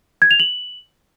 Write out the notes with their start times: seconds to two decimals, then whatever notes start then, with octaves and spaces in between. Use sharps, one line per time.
0.22 G#6
0.31 F7
0.40 F#7